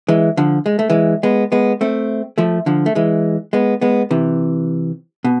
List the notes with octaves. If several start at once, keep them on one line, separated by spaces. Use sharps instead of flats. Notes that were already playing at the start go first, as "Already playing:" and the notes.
E3 G#3
D3 F3
G#3
A3
E3 G#3
G#3 B3
G#3 B3
A3 C4
F3 A3
D3 F3
A3
E3 G#3
G#3 B3
G#3 B3
C3 E3
B2